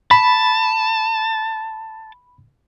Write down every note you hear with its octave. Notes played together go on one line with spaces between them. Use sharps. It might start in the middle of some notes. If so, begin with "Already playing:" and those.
A5 B5